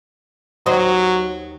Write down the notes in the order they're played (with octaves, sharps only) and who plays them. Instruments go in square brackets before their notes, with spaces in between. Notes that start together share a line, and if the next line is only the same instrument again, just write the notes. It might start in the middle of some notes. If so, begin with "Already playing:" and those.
[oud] D#2 C5 D#5 [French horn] F#3